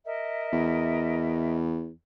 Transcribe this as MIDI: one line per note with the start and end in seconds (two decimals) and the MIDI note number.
0.05 1.57 70
0.05 1.57 75
0.05 1.57 76
0.52 1.90 40